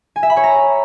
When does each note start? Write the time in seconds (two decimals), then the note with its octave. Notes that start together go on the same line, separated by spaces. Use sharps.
0.16 G#5
0.23 E5
0.30 B5
0.37 C#5
0.43 A#5